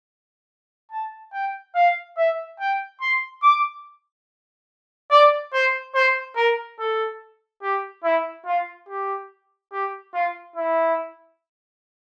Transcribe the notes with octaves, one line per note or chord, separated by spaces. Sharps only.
A5
G5
F5
E5
G5
C6
D6
D5
C5
C5
A#4
A4
G4
E4
F4
G4
G4
F4
E4